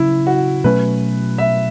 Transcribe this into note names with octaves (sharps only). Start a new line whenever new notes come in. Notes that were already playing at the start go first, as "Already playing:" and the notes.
Already playing: C#3 F#3 C#4 E4
F#4
B2 F#3 A3 C#4 B4
E5